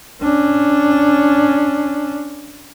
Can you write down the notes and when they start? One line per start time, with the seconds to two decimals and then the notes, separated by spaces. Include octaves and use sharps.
0.22 C#4 D4